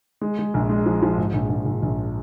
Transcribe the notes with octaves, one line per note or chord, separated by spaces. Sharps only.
G#3
G#3
A#1
G#3
F3
F3
G#2
A#1
A#1
A#1
A#1